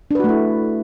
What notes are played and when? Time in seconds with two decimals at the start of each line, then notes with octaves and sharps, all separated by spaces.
0.11 D4
0.15 B4
0.20 F#4
0.24 A3
0.29 E4